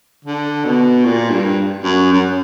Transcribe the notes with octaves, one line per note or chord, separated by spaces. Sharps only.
D3
B2
A#2
G2
F#2
F#2